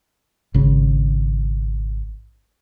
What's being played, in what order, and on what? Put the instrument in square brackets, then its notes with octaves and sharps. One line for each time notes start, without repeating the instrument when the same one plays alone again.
[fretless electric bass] G#1 C#3